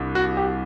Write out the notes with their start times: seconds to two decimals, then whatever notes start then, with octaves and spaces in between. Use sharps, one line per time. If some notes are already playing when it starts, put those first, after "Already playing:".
Already playing: C2 G3 D4
0.15 F#4
0.37 G4